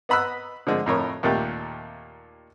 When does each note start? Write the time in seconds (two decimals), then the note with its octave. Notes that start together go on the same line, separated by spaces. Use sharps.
0.09 B3 D#5 B5 E6 F#6
0.67 D3 F3 G#3
0.86 F2 A2 A#4 C#5
1.23 D#2 A#2 A3 G4